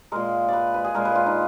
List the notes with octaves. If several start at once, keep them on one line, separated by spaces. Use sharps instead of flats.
A#2 G#3 A#4
B4 D5
B4
G#4
A#2 G#3 A#4
B4
F4
D#4